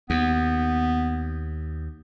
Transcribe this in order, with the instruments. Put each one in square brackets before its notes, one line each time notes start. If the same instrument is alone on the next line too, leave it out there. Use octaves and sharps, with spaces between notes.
[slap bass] D#2 [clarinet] B3